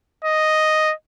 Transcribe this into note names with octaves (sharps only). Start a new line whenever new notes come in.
D#5